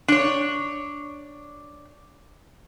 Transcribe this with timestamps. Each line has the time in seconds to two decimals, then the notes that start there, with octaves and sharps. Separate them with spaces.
0.08 D4 C#5